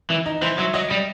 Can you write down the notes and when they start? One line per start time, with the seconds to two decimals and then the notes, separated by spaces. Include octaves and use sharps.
0.10 E3
0.26 D#4
0.42 E3 C5
0.58 F#3 E5
0.74 F#3 D#5
0.90 G3 D#5